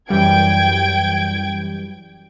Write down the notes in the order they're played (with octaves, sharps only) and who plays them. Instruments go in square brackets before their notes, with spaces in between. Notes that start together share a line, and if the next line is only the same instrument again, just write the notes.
[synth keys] F#2 E3 G3 [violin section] G5 G#6 D7